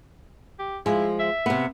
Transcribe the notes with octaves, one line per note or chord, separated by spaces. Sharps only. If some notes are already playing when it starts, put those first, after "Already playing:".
G4
F3 G#3 E4
E5
C3 B3